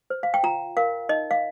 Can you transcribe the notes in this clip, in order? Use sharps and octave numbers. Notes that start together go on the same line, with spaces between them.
C5
F5
G5
F4 A#5
A#4 F5
D#4 D#5
F5